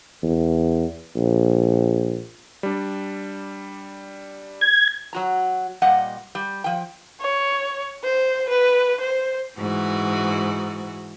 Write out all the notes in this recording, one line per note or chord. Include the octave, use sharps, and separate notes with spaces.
E2
A#1
G3 D4
G#6
F#3 F#4 A#5
A#2 G3 D#5 F#5
G3
F3 G5
C#5
C5
B4
C5
G#2 E3 F#4